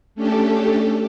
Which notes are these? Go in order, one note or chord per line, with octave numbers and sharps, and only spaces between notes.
A3 C#4 D4 G4 A4